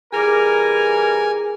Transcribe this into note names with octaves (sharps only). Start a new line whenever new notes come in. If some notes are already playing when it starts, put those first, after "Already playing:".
E3 G3 G#4 A#4 G#5 D6